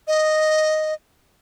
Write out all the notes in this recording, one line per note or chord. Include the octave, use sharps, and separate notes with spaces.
D#5